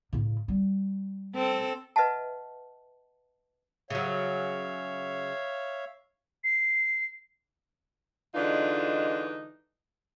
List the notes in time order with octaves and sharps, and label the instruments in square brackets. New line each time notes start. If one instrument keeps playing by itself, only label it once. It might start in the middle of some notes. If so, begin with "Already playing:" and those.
[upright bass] A2 C#3
G3
[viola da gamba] C4 A4
[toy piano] B4 D#5 E5 F#5 A5
[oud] C#3 F#3 [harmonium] C#5 E5 F5
[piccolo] C7
[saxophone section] D3 E3 G#3 D4 D#4 F4